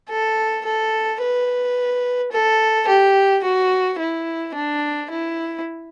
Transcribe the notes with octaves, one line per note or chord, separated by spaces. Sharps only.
A4
A4
B4
A4
G4
F#4
E4
D4
E4